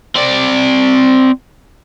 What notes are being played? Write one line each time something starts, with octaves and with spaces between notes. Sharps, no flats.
C4 D5